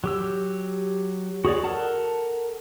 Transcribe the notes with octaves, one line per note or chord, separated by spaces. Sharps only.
F#3 G4 E6
F#4 G#4 C#5 D5
A4 A#4 F#5 A5